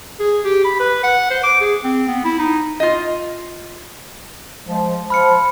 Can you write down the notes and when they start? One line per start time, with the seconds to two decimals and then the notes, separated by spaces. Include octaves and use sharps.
0.20 G#4
0.45 G4
0.65 B5
0.80 B4
1.03 F#5
1.30 C5
1.44 D6
1.61 G#4
1.84 C4
2.08 B3
2.24 E4
2.39 D#4
2.80 F4 D#5
4.65 F3 G#3
5.10 F3 B5 F6 C#7